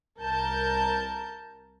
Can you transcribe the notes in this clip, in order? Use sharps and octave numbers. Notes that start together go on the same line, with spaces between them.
C2 A#4 A5 G6